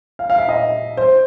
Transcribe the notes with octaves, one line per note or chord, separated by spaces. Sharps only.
F5
F5
E5
D#5
C5